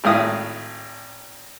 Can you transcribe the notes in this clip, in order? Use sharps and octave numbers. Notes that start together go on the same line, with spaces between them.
G#1 A2 F5 D#6